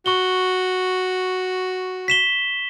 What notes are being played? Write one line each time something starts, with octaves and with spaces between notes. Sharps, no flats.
F#4 C#6 G7
B6 E7 G7